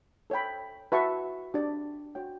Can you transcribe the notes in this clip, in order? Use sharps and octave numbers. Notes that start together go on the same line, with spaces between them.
A4 C#5 G5 B5
F#4 B4 E5 A5 C#6
D4 G4 D5
F#4 C#5 G5